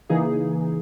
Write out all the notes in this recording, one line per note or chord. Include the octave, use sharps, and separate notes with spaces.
C#3 E3 A#3 D#4 G#4